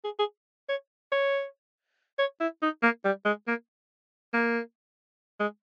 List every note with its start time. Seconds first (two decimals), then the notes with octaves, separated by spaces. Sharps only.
0.05 G#4
0.19 G#4
0.69 C#5
1.12 C#5
2.19 C#5
2.41 E4
2.63 D#4
2.83 A#3
3.05 G3
3.26 G#3
3.48 A#3
4.34 A#3
5.40 G#3